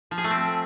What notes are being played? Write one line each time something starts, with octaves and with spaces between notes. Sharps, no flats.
F3
G#4
A3
C4